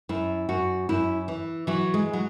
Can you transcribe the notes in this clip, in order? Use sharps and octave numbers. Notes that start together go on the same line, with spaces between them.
F#2 E4
F#2 F#4
F#2 E4
E3
E3 F#3
G#3
F#3